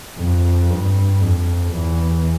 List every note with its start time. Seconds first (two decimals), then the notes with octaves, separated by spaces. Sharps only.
0.18 F2
0.70 G2
1.21 F2
1.74 E2